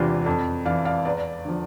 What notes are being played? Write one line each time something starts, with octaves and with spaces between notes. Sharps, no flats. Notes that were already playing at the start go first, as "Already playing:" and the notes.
Already playing: E2 C3 E3 C4 D4 E4 F4
F2
E3 D5 F5
D5 F5
E2 B4 D5
D3 F3